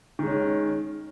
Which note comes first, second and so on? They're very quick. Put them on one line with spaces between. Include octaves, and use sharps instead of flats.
D#3 G#3 C#4